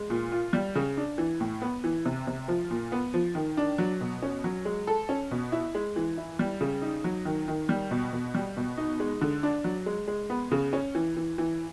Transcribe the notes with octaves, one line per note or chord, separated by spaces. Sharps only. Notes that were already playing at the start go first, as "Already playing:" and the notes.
Already playing: G#3
A#2
F4
G3
C#3
D4
E3
A2
B3
E3
C3
C3
F3
A#2
B3
F3
D#3
D4
F#3
B2
C#4
F#3
G#3
A4
C#4
B2
E4
G#3
E3
E4
G3
C#3
D#4
F#3
D#3
D#3
G3
B2
B2
G3
B2
D#4
G#3
D3
D4
F#3
G#3
G#3
B3
C#3
C#4
E3
E3
E3